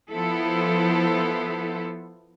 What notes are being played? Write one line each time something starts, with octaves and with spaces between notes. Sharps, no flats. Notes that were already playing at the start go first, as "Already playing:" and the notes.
F3 B3 E4 A4 C5